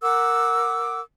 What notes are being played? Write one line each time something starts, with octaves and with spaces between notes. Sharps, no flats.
A#4 F#5 D6 E6